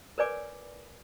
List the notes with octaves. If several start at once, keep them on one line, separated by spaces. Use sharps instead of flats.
A#4 B4 C#5 D5 G#5 D6